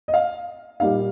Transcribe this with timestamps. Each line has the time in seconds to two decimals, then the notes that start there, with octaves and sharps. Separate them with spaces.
0.08 D#5
0.14 F5
0.80 A#2 G3 A#3 D#4 F5